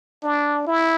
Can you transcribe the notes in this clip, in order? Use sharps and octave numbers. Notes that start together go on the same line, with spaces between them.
D4
E4